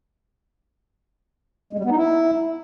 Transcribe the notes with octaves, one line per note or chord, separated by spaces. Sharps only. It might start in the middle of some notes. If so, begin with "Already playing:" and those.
G#3
G3
B3
D#4
E4